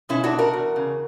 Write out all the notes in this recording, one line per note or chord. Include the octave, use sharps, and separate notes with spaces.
B2 C#4 E4
D4 F#4
B2
F#4 A#4
E2
C#3